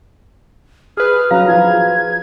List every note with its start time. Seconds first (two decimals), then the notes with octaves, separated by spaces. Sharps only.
0.97 G#4 B4 F6
1.31 F#3 C#4 F5 A#5
1.48 F3 F4 G#6